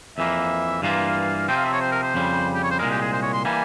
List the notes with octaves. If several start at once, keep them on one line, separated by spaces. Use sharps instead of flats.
F2 E3 A#3 E5
G2 E3 A#3 F4 F5
C3 F3 C4 G5
F5
E5
C#5
C5
A#4
C5
F2 C#3 G3
G4
C#5
C5
C2 A#2 G#3 A#4
G4
G#4
C5
C#5
C6
E3 G3 A#3 G#5